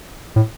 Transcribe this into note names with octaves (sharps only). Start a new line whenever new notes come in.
A2